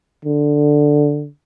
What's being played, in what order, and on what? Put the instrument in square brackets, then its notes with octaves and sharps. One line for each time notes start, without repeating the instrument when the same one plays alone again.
[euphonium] D3